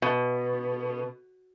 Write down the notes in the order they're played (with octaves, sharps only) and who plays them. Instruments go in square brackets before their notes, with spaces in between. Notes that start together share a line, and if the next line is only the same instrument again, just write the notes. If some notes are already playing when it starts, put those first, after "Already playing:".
[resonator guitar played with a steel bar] B2